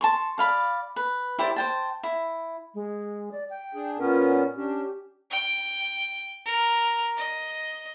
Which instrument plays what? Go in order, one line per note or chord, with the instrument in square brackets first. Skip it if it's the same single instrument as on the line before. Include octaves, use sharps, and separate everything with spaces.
[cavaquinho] A5 C6 C#6
D5 F5 B5
B4
E4 G4 C5 D5
C5 G5 A5
E4
[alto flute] G#3
D5
G5
[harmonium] D4 G#4
[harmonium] A#2 B3 C#4 [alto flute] A#4
[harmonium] C#4 D4 [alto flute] G4
[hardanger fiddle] G5
A#4
D#5